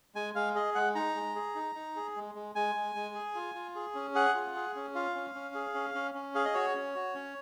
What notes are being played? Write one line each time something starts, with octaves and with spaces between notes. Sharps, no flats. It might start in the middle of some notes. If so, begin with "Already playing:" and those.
G#3 G#5
G#3 F5
G#4 D#5
G#3 F#5
D#4 A#5
G#3
G#4
D#4
D#4
G#4
G#3
G#3
G#3 G#5
G#3
G#3
G#4
F4
F4
G#4
C#4
G#4 F#5
F4
G#4
C#4
F4 F5
C#4
C#4
G#4
C#4
C#4
C#4
G#4 F5
D#5
F#4 C#5
C#4
F#4
C#4